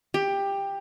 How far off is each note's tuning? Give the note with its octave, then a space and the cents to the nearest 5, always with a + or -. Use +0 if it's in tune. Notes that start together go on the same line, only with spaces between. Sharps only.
G4 +15